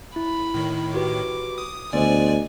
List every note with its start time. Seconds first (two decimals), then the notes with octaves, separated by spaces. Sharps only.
0.16 E4 B5
0.54 A2 D#3
0.94 F#4 G4 B4 D6
1.58 D#6
1.93 D2 B3 C5 D5 D#5 G#5